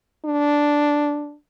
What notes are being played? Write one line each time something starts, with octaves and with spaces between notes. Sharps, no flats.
D4